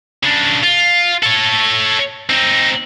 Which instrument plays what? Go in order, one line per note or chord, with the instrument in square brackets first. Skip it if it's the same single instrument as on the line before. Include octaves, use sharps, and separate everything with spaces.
[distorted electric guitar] C#3 D4
F4
A4 C#5
C4 D#4